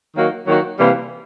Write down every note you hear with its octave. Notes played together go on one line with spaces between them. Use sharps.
D#3 F#3 A#3 D#4 F#4
D#3 F#3 A#3 D#4 F#4
C3 E3 G3 A#3